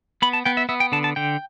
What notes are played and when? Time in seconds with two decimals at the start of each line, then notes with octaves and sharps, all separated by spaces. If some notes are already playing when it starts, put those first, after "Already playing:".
0.22 B3 B5
0.33 A5
0.45 B3 G5
0.57 E5
0.69 B3 E5
0.80 G5
0.92 D3 A5
1.04 A5
1.16 D3 G5